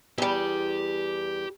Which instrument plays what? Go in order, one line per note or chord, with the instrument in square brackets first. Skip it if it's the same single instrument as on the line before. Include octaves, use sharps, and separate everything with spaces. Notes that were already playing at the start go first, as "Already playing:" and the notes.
[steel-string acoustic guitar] E2 G3 [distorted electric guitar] G4